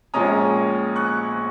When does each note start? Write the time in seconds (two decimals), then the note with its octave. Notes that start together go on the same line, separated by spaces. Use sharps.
0.14 A#1 A#2 G#3 C#4 A#5 D#6
0.96 C#6 F#6